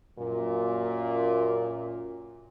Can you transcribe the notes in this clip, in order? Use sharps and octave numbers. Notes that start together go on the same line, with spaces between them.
F#2 A#2